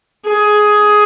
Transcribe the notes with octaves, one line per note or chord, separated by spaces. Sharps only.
G#4